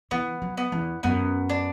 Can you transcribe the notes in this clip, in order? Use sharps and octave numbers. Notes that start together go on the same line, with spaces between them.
E3 B3
F#3
B3
E2
F#2 B3
D4